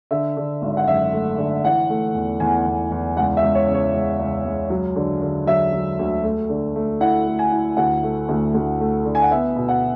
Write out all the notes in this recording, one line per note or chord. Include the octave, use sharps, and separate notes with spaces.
D3 E5
D3
G#1
F#5
F#2 E5
A3
D3
E3 F#5
A3
E2
E2 G#5
E2
E2
C#2 F#5
E5
C#2
C#5
C#3
C#5
C#2
C#2
C#2
F#3
D3
D3
F#3 E5
F#3
D2
A3
D3
A3
E4 F#5
A3
G#5
E4
D2 F#5
A3
D2
D2
A3
D3
G#5
F#5
B3 E5
B2
F#5